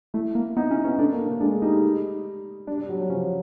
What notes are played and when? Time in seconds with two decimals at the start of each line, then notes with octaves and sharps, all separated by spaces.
0.14 A3 E4
0.35 A#3
0.57 B3 D#4
0.71 C#4 E4
0.84 B3 C#4
0.98 A3 D4
1.12 A#3
1.27 A3
1.40 G#3 D4
1.62 G3 D#4
2.67 G3 D4
2.77 G3
2.89 F#3
3.00 F#3
3.09 F3 C#4